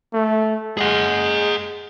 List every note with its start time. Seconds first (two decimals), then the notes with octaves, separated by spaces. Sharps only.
0.13 A3
0.77 G#3 G#4 F#5